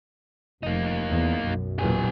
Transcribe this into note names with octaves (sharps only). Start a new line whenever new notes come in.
F1 A#3 D#4
E2
B1 F#2
F#1 E2 A#2 G4 G#5